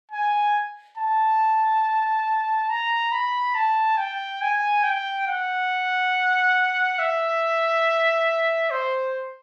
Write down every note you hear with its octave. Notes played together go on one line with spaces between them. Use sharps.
G#5
A5
A#5
B5
A5
G5
G#5
G5
F#5
E5
C5